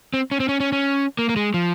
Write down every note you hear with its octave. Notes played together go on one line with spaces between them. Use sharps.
C4
C#4
C4
C#4
C#4
C#4
A#3
A#3
G#3
F3